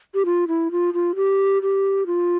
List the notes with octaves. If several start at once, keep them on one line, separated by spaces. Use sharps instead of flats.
G4
F4
E4
F4
F4
G4
G4
F4